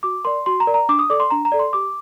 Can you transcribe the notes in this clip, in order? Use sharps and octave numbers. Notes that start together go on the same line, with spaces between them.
F#4 D6
A#4 D5 C6
F#4 C6
A#5
A#4 D5
A#5
D4 D6
D#6
A4 D5 D6
C6
D4 A#5
A#5
A4 D5
C6
G4 D6